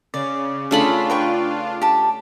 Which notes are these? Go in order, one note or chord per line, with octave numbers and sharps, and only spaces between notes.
C#3 D5
C#3 A3 D4 F4 B5
B4 G5 C#6
G4 A5